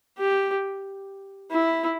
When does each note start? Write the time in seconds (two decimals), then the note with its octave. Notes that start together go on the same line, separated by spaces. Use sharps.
0.18 G4
1.51 E4